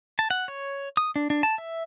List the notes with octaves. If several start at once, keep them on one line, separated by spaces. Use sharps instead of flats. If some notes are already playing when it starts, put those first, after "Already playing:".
A5
F#5
C#5
D#6
D4
D4
A5
E5